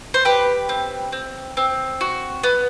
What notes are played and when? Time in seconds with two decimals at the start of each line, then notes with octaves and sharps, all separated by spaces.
0.14 C5
0.25 G4 B4
0.69 C4
1.12 C4
1.57 C4
2.01 F#4
2.43 B3